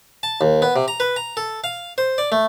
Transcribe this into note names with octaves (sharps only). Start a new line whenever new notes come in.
A5
D#2
B3
C3
A#5
B4
A#5
A4
F5
C5
D5
A3